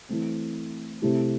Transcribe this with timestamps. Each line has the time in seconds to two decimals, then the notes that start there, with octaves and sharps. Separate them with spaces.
0.09 E3 A3 C4
1.01 C3 A3 E4 G4